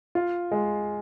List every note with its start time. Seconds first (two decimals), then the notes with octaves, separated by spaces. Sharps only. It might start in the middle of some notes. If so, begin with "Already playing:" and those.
0.15 F4
0.51 G#3